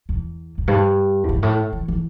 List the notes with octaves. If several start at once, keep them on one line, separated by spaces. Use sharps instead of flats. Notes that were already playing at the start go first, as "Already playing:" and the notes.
E2
E2
G2
E2
G2
A2
E3
E3